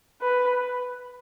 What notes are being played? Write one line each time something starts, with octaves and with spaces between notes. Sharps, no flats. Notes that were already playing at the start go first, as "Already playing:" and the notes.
B4